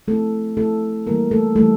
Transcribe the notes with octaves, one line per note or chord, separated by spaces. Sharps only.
F3 A3 C4 E4 A4
F3 A3 C4 E4 A4
E3 G3 A#3 E4 A#4
A3 A4
E3 G3 A3 A#3 E4 A4